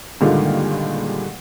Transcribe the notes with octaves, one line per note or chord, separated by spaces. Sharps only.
G2 A#2 D3 D#3 G#3 F4